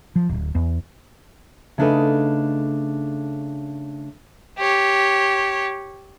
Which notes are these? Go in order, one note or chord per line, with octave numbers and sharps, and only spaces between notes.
F3
D1
E2
C#3 A3 D4 D#4 A4 B4
G4 C#5